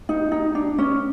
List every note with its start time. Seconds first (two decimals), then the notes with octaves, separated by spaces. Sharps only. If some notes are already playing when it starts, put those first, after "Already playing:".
0.09 D#4
0.32 D#4
0.55 D4
0.78 C#4